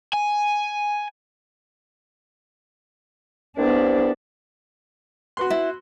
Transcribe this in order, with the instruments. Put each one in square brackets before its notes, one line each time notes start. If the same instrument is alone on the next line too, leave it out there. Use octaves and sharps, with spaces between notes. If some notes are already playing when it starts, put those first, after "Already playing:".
[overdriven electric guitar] G#5
[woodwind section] C2 [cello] B3 D4
[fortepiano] F#4 B4 C6
[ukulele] E4